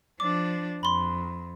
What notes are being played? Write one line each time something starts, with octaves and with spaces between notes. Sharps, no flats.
F3 D4 D6
F2 B5 C6